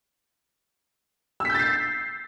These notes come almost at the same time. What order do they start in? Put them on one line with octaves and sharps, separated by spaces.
E6 B6 G6 A6 C7